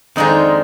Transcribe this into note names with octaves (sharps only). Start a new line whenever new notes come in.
F2 D#3 G#3 D4 D#4 F4